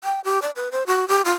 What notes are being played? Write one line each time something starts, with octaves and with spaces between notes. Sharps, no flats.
G5
G4
D5
B4
C5
F#4
G4
F4